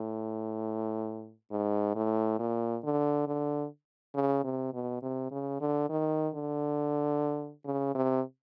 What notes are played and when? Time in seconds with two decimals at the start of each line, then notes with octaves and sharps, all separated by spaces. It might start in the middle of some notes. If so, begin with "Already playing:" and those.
Already playing: A2
1.52 G#2
1.95 A2
2.39 A#2
2.84 D3
3.28 D3
4.15 C#3
4.44 C3
4.73 B2
5.03 C3
5.31 C#3
5.61 D3
5.90 D#3
6.34 D3
7.65 C#3
7.95 C3